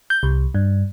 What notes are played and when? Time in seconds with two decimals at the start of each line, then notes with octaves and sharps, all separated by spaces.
0.10 G6
0.23 C2
0.55 G2